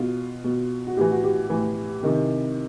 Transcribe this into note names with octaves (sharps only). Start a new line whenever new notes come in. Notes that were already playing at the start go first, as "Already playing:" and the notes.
Already playing: B2 F4
B2
F#4
A2 E3 G4
F#4
G4
A2 E3
C3 D#3